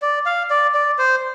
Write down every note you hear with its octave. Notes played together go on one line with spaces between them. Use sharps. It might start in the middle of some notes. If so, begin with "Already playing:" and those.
D5
F5
D5
D5
C5